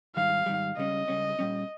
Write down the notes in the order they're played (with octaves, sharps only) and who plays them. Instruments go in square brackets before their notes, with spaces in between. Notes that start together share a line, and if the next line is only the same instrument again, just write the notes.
[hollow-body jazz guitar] G#2 D#3 G3 [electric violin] F5
[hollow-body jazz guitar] G#2 D#3 G3
[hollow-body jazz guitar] C#2 C#3 G3 C#4 [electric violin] D#5
[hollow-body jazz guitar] C#2 C#3 G3 C#4
A#2 G3 C#4